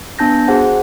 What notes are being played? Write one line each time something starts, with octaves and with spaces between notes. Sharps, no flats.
B3 D4 A5 G6 A#6
F#4 G#4 C5 F#5